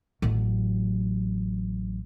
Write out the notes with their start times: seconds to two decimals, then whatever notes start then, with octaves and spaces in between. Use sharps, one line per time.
0.22 A1 F#3